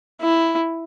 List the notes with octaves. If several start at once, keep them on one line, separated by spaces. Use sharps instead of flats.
E4